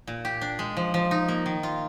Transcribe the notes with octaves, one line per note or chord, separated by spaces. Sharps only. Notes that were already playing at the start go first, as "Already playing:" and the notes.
A#2
G4
D4
G#3
F3
F3
D#4
A#3
D#3
F4